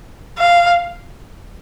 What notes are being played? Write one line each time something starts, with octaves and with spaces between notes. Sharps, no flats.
F5